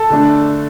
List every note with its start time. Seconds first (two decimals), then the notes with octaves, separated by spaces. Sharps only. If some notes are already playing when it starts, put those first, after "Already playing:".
Already playing: A4 A5
0.10 D3 A3 D4